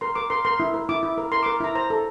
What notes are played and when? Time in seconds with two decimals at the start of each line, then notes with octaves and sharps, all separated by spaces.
0.01 A#4 C6
0.15 A#4 D6
0.30 A#4 C6
0.45 A#4 C6
0.60 E4
0.74 A#4
0.89 E4 D6
1.03 E4
1.18 A#4
1.32 A#4 C6
1.43 D6
1.46 A#4
1.60 E4 A#5
1.75 C5 A#5
1.90 A4